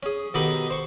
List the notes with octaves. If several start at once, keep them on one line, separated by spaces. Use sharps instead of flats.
C#4 G#4
B2 D#3 D#4 G4 A4 B5
C5 C#6